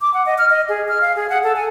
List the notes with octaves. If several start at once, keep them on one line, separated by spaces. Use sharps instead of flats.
D6
F#5
D#5
F6
D#5
G#4
F6
F5
G#4
F#5
A4
G#5